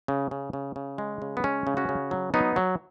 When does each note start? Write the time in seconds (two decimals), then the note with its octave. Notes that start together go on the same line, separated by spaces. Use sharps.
0.08 C#3
0.31 C#3
0.53 C#3
0.76 C#3
0.98 G#3
1.22 C#3
1.37 B3
1.44 G#3 C#4
1.67 C#3
1.77 C#4 F#4
1.89 C#3
2.11 F#3
2.34 F#3 B3 D#4
2.56 F#3